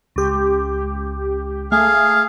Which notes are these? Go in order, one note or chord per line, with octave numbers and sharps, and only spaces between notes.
C#2 G4
A3 G#4 F5